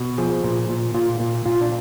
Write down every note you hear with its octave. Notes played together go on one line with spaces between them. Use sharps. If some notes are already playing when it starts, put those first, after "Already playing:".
Already playing: B2
F3 G#4
A#2
A#2
A#2 F4
A#2
A#2 F4
D4